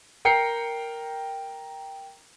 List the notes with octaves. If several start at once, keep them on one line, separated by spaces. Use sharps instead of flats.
A#4 G5 A#5 C7 C#7